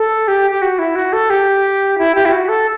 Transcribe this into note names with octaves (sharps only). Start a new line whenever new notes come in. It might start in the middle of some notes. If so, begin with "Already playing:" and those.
Already playing: A4
G4
G4
F#4
E4
F#4
A4
G4
E4
G4
E4
F#4
A4